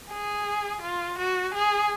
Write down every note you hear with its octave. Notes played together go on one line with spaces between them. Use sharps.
G#4
F4
F#4
G#4